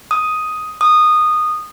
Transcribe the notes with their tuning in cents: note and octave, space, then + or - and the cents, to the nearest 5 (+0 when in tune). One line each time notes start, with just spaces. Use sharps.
D#6 +5
D#6 -15